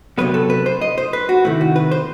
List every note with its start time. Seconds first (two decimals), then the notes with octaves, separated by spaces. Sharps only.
0.18 C3 F#3 B3 B4
0.34 A4
0.50 B4
0.66 C5
0.81 D#5
0.98 C5
1.13 B4
1.29 F#4
1.45 C3 D#3 A3 E4
1.61 F#4
1.76 B4
1.91 C5